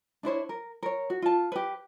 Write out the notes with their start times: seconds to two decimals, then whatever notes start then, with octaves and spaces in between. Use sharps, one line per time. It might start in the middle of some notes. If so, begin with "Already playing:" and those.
0.23 D4 E4 C5 C#5
0.49 A#4
0.83 A#4 C#5
1.10 F#4
1.22 F4 A5
1.52 G4 B4